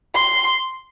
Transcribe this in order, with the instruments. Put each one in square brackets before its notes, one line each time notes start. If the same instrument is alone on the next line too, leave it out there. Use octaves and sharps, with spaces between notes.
[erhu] C6